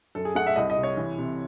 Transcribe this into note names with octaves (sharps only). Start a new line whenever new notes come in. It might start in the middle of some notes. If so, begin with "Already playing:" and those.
F#2 A4
G#4
A3 F#5
E5
C2 D#5
D#5
C3
C#5
E3
C3